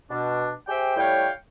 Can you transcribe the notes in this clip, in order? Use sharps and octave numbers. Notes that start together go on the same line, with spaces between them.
B2 D4
G4 G#4 C5 E5 G5
A2 G3 C#5 F5 G5